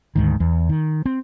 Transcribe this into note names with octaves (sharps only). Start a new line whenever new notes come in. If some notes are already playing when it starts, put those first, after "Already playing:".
D2 G#2 D#3
E2
D#3
C4